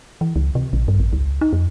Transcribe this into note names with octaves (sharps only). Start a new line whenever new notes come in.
E3
C#2
C3
A#1
G2
A1
C#2
D#4
F2